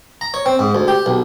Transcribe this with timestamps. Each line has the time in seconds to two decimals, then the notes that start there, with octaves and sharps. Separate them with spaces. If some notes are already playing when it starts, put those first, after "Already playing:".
0.21 A#5
0.34 C#5
0.46 C4
0.59 G#2
0.75 D2
0.88 G4
1.06 B1